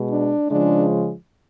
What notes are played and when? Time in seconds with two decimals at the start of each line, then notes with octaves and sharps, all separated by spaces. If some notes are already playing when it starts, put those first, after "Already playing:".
Already playing: B2 G#3
0.10 D4
0.49 C#3 F3 G#3 D4